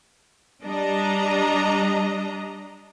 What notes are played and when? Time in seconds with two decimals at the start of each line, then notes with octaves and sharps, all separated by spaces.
0.63 G3 D4 D#5 A#5